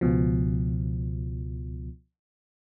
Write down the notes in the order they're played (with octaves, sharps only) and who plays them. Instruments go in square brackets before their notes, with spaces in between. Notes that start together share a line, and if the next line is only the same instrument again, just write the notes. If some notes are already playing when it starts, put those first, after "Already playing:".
[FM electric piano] C#2 B2 F3